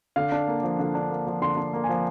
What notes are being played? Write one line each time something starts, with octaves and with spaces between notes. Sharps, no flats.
D3 F5
D4
A#3
F3
D3
D4
A#3
F3
D3 C6
D4
A#3
G#5
F3